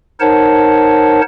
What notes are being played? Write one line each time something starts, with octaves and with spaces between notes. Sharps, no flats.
D#4 A#4 C5 C#5 F#5 A5